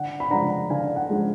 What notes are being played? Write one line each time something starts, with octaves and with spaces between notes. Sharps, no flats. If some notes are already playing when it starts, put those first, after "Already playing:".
Already playing: D3 F#5
B5
F3 G#3 D4 F#5 A#5
D3 F5 G#5
F#5
F3 G#3 D4